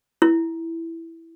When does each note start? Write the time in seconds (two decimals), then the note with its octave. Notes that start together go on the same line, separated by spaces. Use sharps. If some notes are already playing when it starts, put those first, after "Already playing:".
0.22 E4